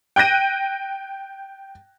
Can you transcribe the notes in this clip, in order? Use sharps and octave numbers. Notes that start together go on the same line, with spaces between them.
G5 F#6 G6 A#6 D#7